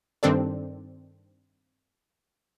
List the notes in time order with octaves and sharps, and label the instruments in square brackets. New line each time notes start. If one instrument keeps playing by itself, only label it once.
[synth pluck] G2 D#3 C4 D4 A4 D5